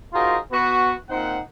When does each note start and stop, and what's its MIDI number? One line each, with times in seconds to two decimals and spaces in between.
0.14 0.37 63
0.14 0.37 65
0.14 0.37 66
0.14 0.37 68
0.14 0.37 70
0.14 0.37 72
0.52 0.93 59
0.52 0.93 66
1.09 1.39 46
1.09 1.39 60
1.09 1.39 63
1.09 1.39 72
1.09 1.39 78